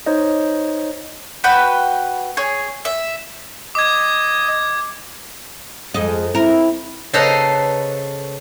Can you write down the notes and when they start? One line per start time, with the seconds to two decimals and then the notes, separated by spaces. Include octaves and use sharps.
0.06 D#4 C5 C#5 D#5
1.44 F#4 B4 G5 B5
2.37 G#4 C#5
2.85 E5
3.75 D#5 D6 G#6
5.94 F2 G#3 D#5
6.35 C4 E4 A#4
7.13 C#3 A4 B4 C5 D#5 A#5